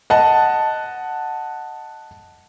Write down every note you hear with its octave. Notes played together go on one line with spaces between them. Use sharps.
D#5 F#5 A5